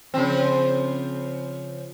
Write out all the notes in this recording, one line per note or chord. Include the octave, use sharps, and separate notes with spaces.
C#3 F3 C4